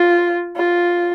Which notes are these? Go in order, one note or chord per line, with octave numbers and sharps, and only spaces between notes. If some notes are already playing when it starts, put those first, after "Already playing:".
Already playing: F4
F4